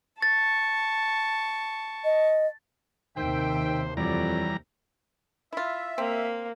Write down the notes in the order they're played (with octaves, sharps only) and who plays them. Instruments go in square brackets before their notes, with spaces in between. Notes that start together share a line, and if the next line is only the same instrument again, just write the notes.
[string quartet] A5 C#6 [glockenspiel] A6
[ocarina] D#5
[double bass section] D#2 C3 [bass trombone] D#3 [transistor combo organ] C5 [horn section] E5 G5
[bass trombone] F2 [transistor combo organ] E3 G3 A#5 [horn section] F#3 D5
[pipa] E4 F4 [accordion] E5
[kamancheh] A#3 [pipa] C4